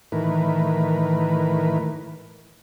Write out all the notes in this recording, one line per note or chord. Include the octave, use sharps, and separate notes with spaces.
A2 D#3 E3 A#4 B4